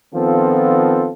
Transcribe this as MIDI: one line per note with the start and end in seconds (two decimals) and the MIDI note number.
0.15 1.11 51
0.15 1.11 53
0.15 1.11 59
0.15 1.11 60
0.15 1.11 65
0.15 1.11 69